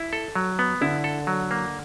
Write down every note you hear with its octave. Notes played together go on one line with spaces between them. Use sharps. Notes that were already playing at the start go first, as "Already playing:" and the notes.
Already playing: E4
A4
F#3
B3
D3 E4
A4
F#3
A#3